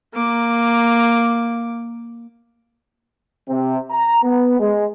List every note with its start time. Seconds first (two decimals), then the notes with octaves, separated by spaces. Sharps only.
0.14 A#3 D6
3.49 C3
3.91 A#5
4.24 B3
4.60 G#3